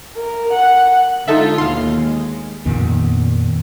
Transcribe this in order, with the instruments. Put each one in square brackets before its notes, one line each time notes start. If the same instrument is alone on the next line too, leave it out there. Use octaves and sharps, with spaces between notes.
[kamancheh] A#4
F#5
[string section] D3 G#3 F4 [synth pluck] D#4 A4 E5
[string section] D#2 B2 [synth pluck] F5 C6
[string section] G#3
[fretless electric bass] F2 A#2 D#3 B3